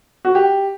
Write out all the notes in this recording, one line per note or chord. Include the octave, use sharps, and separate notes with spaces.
F#4
G4